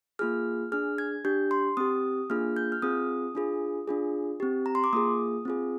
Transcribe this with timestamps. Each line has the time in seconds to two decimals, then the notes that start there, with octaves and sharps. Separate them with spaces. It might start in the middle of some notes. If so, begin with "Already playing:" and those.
0.19 A#3 F4 G#4 F6
0.72 D4 G#4 F6
0.98 G#6
1.25 D4 G4 G6
1.51 C6
1.77 C4 G4 D#6
2.30 A#3 D4 F4 G#4 F6
2.56 G6
2.72 F6
2.82 C4 F4 G#4 D#6
3.35 D4 F4 G#4
3.88 D4 F4 G#4
4.40 C4 G4
4.66 A#5
4.75 C6
4.84 D6
4.93 A#3 F4 G#4 D#6
5.45 C4 F4 G#4